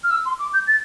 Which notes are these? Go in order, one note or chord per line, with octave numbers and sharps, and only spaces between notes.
F6
E6
C6
D6
G6
A6